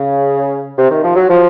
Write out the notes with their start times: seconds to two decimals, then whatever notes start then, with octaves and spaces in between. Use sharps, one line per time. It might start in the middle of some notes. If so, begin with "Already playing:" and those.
Already playing: C#3
0.78 C3
0.91 D#3
1.04 F3
1.16 F#3
1.29 F3